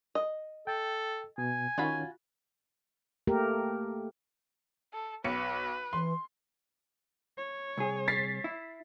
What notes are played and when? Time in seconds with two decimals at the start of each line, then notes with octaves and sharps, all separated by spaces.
0.15 D#5
0.67 A4 G5
1.38 B2 G#5
1.78 D#3 C#4 F4 F#4 C#5 B5
3.27 A3 A#3 G4 A#4
4.94 A4
5.24 B1 B4 C#7
5.93 E3 C6
7.37 C#5
7.78 C2 G#4
8.08 A6 B6 C7
8.44 E4